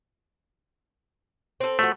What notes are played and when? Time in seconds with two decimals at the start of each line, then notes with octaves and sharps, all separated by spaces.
1.60 C4 A4
1.79 F3 A3 F#4